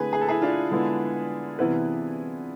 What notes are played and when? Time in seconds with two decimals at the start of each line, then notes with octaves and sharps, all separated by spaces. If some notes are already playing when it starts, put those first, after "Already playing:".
Already playing: D3 A3 C4 E4 G#4 B4
0.13 G#4
0.21 A4
0.29 E4 G#4
0.42 D4 F4
0.71 D3 G#3 B3 E4
1.59 C3 E3 B3 E4 B4